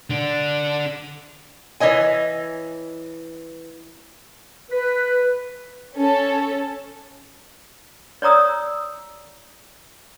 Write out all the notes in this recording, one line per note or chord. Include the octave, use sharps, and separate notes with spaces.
D3 D4
E3 C#5 D#5 G#5
B4
C#4 A4
C#5 D5 A#5 D#6 E6